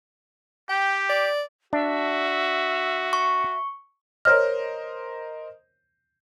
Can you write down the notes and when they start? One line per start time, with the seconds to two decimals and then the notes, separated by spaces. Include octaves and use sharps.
0.70 G4 G5
1.10 D5
1.73 D4 F#4 E5
3.13 C#6
4.25 A#4 C5 C#5 D#5 F6